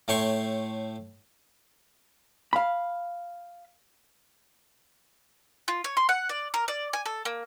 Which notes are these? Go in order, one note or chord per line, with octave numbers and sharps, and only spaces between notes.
A2 A3 C#5 G5 C6 C#6
F5 B5
F4
C#5
C6
F#5
D5
A#4
D5
G#5
A4
A#3